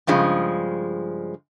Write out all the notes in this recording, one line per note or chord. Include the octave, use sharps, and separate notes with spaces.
G2 C#3 F3 G#3